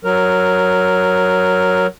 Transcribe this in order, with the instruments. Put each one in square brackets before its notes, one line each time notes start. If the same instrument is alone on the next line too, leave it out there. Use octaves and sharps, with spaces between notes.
[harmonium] F#3 A#4